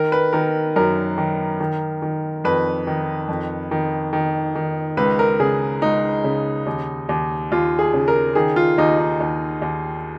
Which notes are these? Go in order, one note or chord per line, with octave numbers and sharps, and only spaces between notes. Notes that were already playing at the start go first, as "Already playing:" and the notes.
Already playing: D#3 A#4
B4
D#3 A#4
F#2 A#4
D#3
D#3
D#3
F2 B4
D#3
F2
D#3
D#3
D#3
C#2 B4
A#4
C#3 G#4
C#2 D#4
C#3
D#2
D#2
D#2 F4
G#4
C#3
A#4
D#3 G#4
F4
D#2 D#4
D#4
D#2
D#2